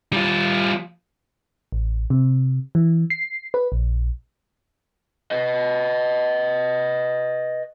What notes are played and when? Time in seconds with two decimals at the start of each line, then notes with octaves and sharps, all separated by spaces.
0.13 G3 F4
1.72 A1
2.10 C3
2.75 E3
3.10 C7
3.54 B4
3.72 A#1
5.31 B4 D#5